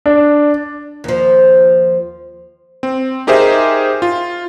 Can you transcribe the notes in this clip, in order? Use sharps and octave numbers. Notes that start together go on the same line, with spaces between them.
D4
D#2 F3
C4
D#4 G4 G#4 A#4 C5 E5
F4